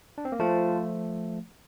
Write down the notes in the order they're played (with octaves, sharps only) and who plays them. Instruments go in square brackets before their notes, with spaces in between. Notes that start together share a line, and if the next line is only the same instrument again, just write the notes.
[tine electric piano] D4
C4
A#3
[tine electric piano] F3 A3 [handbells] F4 C5 F5 A5